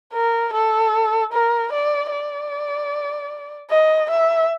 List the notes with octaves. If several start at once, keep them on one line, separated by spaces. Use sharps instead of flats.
A#4
A4
A#4
D5
D5
D#5
E5